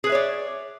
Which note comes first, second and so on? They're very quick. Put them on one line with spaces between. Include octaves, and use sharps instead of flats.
G#4 B4 E5 C#5 D5